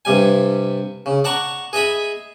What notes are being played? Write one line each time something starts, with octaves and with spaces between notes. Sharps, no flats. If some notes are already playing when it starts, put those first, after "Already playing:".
G2 C3 G3 G#5
C#3
D5 F#5 A5 A#5 C#6
G#4 D#5 E5 B5